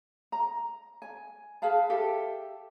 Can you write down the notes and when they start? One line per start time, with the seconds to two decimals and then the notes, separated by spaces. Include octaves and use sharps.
0.32 A#5
1.02 G#5
1.62 G#4 B4 F5 A5
1.90 G4 A4 E5